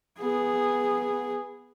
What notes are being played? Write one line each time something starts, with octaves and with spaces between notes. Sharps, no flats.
B3 G#4